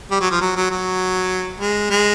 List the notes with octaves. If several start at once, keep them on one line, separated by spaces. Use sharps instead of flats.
G3
F#3
F3
F#3
F#3
F#3
G#3
G#3